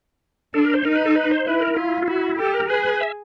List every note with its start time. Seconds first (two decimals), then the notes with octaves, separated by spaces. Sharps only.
0.54 D4 A4
0.65 A#4
0.74 C5
0.85 D#4 A#4
0.95 B4
1.05 A4
1.16 B4
1.31 C5
1.46 E4 B4
1.61 A#4
1.76 E4 F4
2.02 F4
2.08 E4 F#4
2.39 G4 A4
2.54 A#4
2.69 G#4 B4
3.01 E5